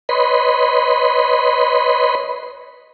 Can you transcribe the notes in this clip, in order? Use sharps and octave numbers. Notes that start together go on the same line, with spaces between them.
B4 C#5 D#5 B5 C6